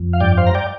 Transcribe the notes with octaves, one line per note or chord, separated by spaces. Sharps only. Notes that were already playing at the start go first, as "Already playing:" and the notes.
Already playing: F2
F5
G2 D5 G5
C5 F5
A#5
D5 G5